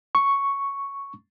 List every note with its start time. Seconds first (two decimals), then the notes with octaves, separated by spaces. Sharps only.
0.15 C#6